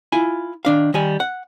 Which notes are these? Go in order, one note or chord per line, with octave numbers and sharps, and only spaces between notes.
E4 F4 G#5
D#3 D4 F5
D#3 G3 G#5
F#5